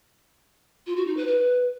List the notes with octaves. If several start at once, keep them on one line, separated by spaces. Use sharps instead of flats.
F4
F#4
D#4
B4
B4